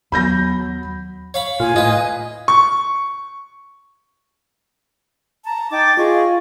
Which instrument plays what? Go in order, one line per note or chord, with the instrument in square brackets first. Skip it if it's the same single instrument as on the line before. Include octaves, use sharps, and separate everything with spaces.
[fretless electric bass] D#2 B3 [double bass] F#3 [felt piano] B5 G6 A#6
[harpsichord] C#5 F5 B5
[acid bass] A#2 [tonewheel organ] F4 [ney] G#5
[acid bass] A2 [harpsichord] F4 B4 [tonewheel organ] D#5
[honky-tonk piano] C#6
[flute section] A5 A#5
[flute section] D#4 G5 D6 [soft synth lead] A6
[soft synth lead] F4 [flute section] G#4 D#5 C#6